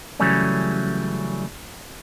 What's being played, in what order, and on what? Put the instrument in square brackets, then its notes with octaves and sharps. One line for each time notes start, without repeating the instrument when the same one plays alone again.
[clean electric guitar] C#3 E3 F#3 G3 A3 C#4